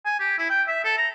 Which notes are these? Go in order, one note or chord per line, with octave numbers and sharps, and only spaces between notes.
G#5
G4
E4
G5
E5
A4
A#5